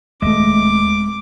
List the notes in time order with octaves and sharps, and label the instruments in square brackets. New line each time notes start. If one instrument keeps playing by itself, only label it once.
[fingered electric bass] D#1 A3 [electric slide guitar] G#3 D#5 E5 [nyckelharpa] D6